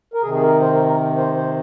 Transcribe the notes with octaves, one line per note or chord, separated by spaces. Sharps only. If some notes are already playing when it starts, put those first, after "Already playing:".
A#4
C3 D#3 G#4
G#4
A#4
C5
A#4
A#4
C5
C5